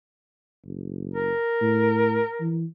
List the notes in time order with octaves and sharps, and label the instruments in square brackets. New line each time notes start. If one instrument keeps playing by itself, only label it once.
[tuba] F#1
[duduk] A#4
[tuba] A2
E3